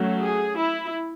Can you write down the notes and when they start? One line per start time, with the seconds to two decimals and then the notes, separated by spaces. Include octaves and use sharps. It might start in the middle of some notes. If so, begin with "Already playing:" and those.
Already playing: F#3 A3 C#4
0.20 G#4
0.57 E4